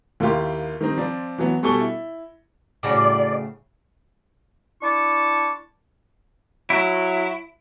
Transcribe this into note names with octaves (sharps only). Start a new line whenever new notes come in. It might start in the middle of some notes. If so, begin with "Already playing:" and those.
D#2 A#3 E4 F4 G4 C6
D#3 G3 C4 D#4
F3 C4 D5
E3 F#3 B3
B2 G3 A4 G#5 C#6 G7
E4
A2 C#3 F#4 D5
D4 E4 A5 C#6 D6
F#3 E4